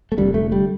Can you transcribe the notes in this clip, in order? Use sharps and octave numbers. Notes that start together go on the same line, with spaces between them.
A3
F1 F2 D3 G3
A3
G3